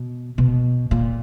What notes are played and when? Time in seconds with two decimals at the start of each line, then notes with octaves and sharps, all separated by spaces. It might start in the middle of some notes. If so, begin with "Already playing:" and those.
Already playing: B2
0.38 B2
0.91 A#2